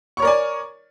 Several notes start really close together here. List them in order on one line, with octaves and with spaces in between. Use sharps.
C#6 C#5 A#4 D5 G#5